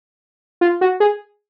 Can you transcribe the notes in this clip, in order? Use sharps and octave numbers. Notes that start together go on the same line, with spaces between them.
F4
F#4
G#4